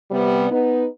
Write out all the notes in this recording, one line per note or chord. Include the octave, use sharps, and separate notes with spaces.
C3 G3 B3
B3 D#4 B4